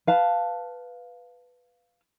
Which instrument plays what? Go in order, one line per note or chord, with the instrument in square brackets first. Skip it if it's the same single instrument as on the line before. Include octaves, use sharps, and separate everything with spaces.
[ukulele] B4 F5 A5